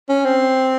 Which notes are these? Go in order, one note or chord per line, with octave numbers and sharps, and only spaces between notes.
C#4
C4